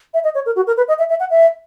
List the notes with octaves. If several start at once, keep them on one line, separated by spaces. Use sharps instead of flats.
E5
D#5
C#5
A#4
F#4
A#4
B4
D#5
E5
E5
F#5
E5